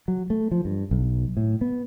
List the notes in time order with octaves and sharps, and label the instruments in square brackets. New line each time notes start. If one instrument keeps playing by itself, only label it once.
[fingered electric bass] F#3
A3
F3
G2
B1
A2
B3